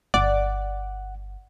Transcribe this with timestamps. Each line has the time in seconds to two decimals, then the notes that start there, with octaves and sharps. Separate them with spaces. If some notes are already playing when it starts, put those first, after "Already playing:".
0.14 G1 D5 F#5